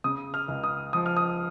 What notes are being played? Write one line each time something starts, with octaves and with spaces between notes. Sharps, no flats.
C#3 D#6
F6
C#2
D#6
F3 D#6
F6
D#6